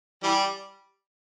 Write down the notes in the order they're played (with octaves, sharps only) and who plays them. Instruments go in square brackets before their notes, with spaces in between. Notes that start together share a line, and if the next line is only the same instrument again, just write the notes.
[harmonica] E3 G3